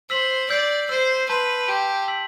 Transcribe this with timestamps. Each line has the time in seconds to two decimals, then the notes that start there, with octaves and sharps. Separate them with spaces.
0.10 C5 E6 B6 F#7
0.50 D5 E6 G6 C7
0.89 C5 E6 G6 C7
1.29 B4 A5 C6 G6
1.68 G4 A5 C6 G6
2.08 E6 B6 F#7